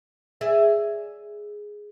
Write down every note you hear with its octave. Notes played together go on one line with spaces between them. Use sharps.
G#4 D5 E5